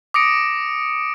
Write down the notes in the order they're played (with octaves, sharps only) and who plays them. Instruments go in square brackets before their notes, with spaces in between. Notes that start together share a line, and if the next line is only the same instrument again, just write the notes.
[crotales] D6 D#6 A#6 C#7 D7